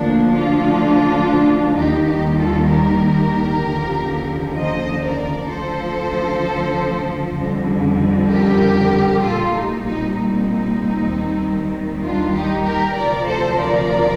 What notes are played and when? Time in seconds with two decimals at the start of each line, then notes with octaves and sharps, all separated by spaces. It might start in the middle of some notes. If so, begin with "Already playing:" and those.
Already playing: D2 D3 F3 A#3 D4
0.35 D4 F4
1.75 D#2 D#3 G3 D#4 G4
2.07 D#4 G4
2.38 F4 A4
2.69 G4 A#4
3.62 D#2 D3 F3
4.56 C5 D#5
5.02 A#4 D5
5.49 D2 D3 F3 A4 C5
7.36 F2 D3 G3
8.30 G4 A#4
9.23 A#1 A#2 G3 F4 A4
9.54 D#4 G4
9.85 C4 D#4
10.16 C4 D#4
11.10 D#2 D#3 G3
12.03 D4 F4
12.35 D#4 G4
12.65 G4 A#4
12.96 D2 C3 F3 A#4 D5
13.28 A4 C5
13.59 A#4 D5